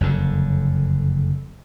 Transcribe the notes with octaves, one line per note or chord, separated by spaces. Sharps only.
F#1 F2 D3